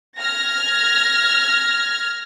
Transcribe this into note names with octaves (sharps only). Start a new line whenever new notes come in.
F6 G#6 A#6